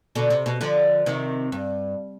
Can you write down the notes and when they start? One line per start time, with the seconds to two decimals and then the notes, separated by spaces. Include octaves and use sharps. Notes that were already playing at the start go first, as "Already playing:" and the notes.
0.15 B2 D3
0.30 C3
0.46 B2
0.61 D3 F3
1.06 C3 D#3
1.52 G2